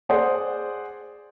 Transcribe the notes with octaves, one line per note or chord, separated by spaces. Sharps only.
G#4 C5 D5 F#5